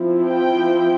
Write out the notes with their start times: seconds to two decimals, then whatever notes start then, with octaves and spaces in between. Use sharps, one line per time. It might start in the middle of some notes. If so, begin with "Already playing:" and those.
Already playing: F3 C4 E4
0.27 G5